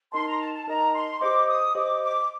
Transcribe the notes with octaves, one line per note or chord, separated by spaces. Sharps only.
D#4 A#4 D#5 A5 C6
A#5
A5
A5
D#4 A#4 D#5 A5 A#5
C6
G4 C5 D#5 D6
D#6
G4 C5 D#5 D6
D6